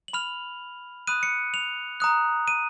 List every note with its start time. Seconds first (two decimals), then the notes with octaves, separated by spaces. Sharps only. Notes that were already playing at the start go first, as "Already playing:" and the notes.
0.08 F#7
0.13 B5 F6 F7
1.07 B5 D#6 F#6 D#7
1.23 C#7
1.54 F7
2.00 A#5 D#6 F#6
2.48 D#7